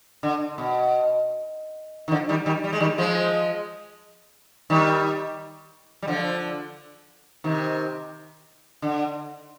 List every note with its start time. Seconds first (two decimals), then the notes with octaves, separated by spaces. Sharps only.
0.23 D3
0.58 B2
2.08 D#3
2.11 D3 F3
2.29 D#3 G3
2.46 D#3 G3
2.64 G3
2.73 G#3
2.80 D#3 G3
2.98 F3 G#3
4.70 D#3 G3
6.02 G3
6.08 D3 F3
7.44 C3 D#3
8.82 D3